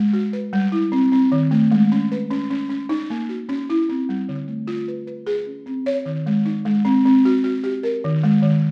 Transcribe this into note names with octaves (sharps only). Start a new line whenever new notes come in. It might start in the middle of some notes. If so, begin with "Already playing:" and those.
Already playing: G#3
F#4
B4
G3
E4
C4
C4
D#3
A3
G#3
C#4
B4
C#4
C#4
C#4
D#4
A#3
F#4
C#4
E4
C4
G3
D3
A3
F4
B4
B4
G#4
C#4
C4
C#5
D#3
G#3
D#4
G#3
C4
C4
F#4
F#4
G4
A#4
D#3
G#3
D#3